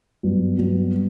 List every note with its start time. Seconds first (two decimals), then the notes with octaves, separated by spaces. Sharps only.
0.23 G2 F#3 B3
0.58 G2 F#3 B3